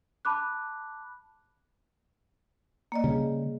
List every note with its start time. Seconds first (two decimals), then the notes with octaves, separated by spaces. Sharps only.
0.25 A5 B5 D6 F#6
2.92 A#3 D5 D#5
3.04 C#3 G3 G#4